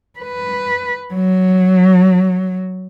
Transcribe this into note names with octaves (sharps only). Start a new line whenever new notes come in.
B4
F#3